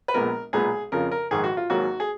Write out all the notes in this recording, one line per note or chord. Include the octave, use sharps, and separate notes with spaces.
B4
A#1 A#2 G#3 B3 A#4
B1 A#2 G#3 B3 G#4
F2 C#3 F3 A#4
A#4
A#1 G#2 D#3 G#4
F#4
F4
G#1 G#2 F#3 A#3 F#4
G#4